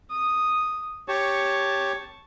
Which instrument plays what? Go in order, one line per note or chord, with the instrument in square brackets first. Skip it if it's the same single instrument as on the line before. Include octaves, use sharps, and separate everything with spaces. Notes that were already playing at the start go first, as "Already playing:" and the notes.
[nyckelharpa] D#6
[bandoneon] G4 C#5 [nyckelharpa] A5 C#6